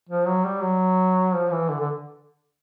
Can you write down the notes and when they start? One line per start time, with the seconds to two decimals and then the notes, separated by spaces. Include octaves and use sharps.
0.09 F3
0.28 F#3
0.45 G3
0.63 F#3
1.35 F3
1.52 E3
1.70 D3
1.80 D3